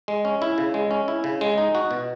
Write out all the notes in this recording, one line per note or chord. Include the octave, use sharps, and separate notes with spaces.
G#3
C#4
E4
C#3
G#3
C#4
E4
C#3
G#3
D#4
F#4
B2